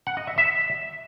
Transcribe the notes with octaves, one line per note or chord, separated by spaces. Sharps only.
F#5
D#5
E5
E5